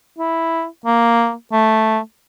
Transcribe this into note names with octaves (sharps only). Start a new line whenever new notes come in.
E4
A#3
A3